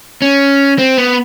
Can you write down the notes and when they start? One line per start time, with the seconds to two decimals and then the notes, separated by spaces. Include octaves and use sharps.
0.22 C#4
0.79 C4
0.98 B3